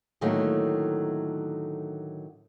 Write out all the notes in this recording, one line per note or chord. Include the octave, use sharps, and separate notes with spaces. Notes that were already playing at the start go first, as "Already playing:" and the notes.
A2 D3 D#3 F#3 A3 A#3